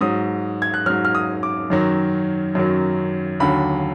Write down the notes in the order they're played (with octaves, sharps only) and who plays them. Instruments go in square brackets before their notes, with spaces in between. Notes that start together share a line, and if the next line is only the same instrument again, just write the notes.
[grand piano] G#2 F#3 D#6
G#6
F#6
G#2 F#3 F6
F6
D#6
D6
F#2 D#3 F#3
F#2 D#3 F#3
D#2 D3 F#3 B5